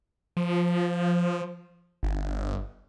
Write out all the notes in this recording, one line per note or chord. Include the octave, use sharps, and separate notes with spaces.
F3
G1